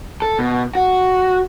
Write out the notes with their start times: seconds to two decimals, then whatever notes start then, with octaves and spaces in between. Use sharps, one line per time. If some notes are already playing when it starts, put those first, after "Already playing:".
0.22 A4
0.39 B2
0.75 F#4